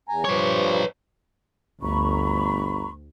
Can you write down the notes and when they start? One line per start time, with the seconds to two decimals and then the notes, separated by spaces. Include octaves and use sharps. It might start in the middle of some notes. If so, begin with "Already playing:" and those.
0.09 E2 G#5 A#5
0.25 G2 F3 G3 B4 C#5
1.82 G1 D2 A#5 B5 C#6